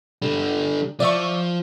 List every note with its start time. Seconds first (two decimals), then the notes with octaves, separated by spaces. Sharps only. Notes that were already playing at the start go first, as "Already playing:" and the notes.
0.22 D3 G3
1.00 F3 D5 E5 C#6